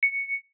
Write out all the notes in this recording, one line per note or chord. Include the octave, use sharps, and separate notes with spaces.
C#7